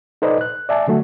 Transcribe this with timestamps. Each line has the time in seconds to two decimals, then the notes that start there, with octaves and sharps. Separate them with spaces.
0.22 D#4 A4 B4 C5 D5 D#5
0.41 F#6
0.69 D5 E5 G#5 A5
0.88 D3 F#3 A3 F#4